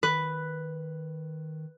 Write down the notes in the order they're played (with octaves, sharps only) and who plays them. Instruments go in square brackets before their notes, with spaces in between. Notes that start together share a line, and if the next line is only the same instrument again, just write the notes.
[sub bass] D#3 [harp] B4